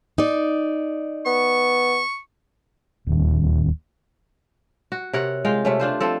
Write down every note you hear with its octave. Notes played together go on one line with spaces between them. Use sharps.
D#4 D5
B3 C#6
D1 D#2
F#4
C3 A#4 C#5 F#5
G#3 F4 F5 G5
C3 A3 C#4
D4 F4 C5
F3 C4 A4